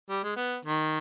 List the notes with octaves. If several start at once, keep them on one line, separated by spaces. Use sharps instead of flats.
G3
G#3
B3
D#3